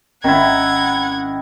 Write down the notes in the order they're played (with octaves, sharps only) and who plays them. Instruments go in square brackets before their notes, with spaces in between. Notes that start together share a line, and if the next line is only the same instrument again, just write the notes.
[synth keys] G#1 C#4 [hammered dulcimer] D#3 E4 [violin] F#5 G#6